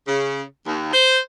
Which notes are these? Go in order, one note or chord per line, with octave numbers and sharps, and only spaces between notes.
C#3
D#2
C5